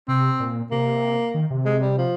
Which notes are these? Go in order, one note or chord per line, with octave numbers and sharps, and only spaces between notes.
C3 C4
A#2
C3 A#3
D#3
C3
G#3
G3
F3